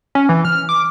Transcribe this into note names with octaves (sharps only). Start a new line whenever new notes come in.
C#4
E3
F6
D6